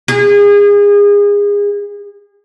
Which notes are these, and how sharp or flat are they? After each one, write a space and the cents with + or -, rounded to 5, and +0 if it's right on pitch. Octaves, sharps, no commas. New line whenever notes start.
G#4 -30